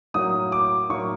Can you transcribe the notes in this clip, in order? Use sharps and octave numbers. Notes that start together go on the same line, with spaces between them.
A2 F#3 A#3 D#6
D6
A2 F#3 A#3 C#6